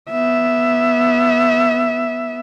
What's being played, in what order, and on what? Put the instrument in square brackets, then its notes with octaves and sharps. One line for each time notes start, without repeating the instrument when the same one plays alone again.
[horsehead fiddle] B3 E5